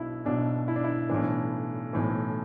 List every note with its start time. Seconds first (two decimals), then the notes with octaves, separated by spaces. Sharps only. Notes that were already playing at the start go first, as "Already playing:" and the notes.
Already playing: B1 B2 D4 E4
0.25 B1 B2 D4
0.68 E4
0.76 D4
0.84 E4
1.09 B1 A2 E3 D4
1.93 B1 A2 E3